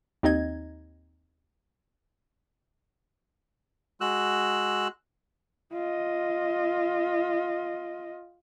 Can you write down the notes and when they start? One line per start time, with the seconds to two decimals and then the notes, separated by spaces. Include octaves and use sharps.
0.23 D#2 C4 D#4 D#5 G#6
4.01 G#3 F#4 E6 F#6
5.73 F4 D#5